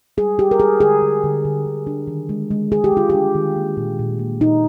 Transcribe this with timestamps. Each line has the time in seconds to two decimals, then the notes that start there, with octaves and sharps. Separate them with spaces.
0.17 G3 G#4
0.38 G3 G4
0.51 A#4
0.60 G3 G#4
0.80 D3 G#4
1.02 D3
1.24 D3
1.45 D3
1.66 D3
1.87 D4
2.07 D#3
2.29 G#3
2.51 G#3
2.72 G#3 G#4
2.84 G4
2.92 G#3 F4
3.10 D4 G4
3.35 D#3
3.56 A#3
3.77 A#2
3.99 A#2
4.19 A#3
4.41 A#2 D#4